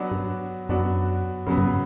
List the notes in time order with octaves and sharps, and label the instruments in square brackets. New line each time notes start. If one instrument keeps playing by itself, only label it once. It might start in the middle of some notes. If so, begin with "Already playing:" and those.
Already playing: [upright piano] F#3 B3 D4 F#4
[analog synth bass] G2
[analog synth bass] F#2 [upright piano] F#3 B3 D4 F#4
[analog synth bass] F#2 [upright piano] C#3 F#3 B3
[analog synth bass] G2